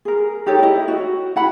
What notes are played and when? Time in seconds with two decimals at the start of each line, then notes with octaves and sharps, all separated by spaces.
0.05 G#4 A#4
0.46 D#4 G4 A4 C#5
0.59 E4 D#5
0.88 F#4
1.36 E4 F#5 B5